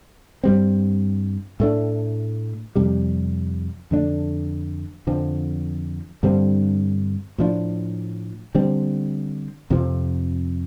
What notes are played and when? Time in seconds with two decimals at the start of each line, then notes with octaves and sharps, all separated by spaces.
0.44 G2 G3 C4
1.60 A2 A3 D4
2.76 F2 C3 G3
3.91 F2 D3 A3 D4
5.07 F2 D3 F3 C4
6.23 G2 D3 G3 C4
7.38 A2 F3 D4
8.55 D3 G3 C4
9.70 F2 C3 F3